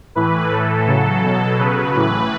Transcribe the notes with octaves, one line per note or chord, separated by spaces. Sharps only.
A2 E3 B4
A2 E3 A4
C#3 F#3
B2 F#3
C#3 F#3 B4
A2 E3